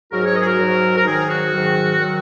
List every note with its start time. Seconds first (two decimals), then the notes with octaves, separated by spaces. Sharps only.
0.12 G#2 F#3 F#4 A#4
0.23 G#4 C#5
0.35 A#4 D#5
0.41 G#4
0.47 F#4 A#4
0.59 G#2 F#3
0.97 A#4
1.05 G#2 D#3 F#3 D#4 G#4
1.29 F#4
1.52 G#2 D#3 F#3
1.98 D#3 F#3